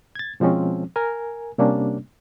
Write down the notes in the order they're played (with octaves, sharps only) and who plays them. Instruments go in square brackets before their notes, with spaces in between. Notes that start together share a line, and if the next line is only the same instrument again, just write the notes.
[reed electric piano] G#6 A6
B2 F3 G#3 C4 C#4
A#4 G#5
C3 G3 A#3 C#4 D4